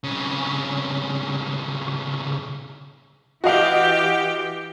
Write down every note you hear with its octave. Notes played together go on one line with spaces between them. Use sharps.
B1 C#3
E3 F#4 G4 D#5 F5